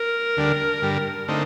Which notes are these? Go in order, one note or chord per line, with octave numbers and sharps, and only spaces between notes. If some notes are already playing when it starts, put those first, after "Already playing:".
Already playing: A#4
D2 D3 G3 D4
G2 D3 G3
D3 A3 C4 D#4